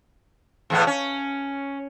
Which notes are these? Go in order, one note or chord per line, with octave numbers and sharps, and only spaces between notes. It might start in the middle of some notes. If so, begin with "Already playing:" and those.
E2 A2 B3
C#4